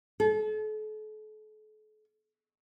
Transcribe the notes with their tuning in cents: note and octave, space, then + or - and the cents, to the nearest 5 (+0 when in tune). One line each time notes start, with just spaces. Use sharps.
A4 -40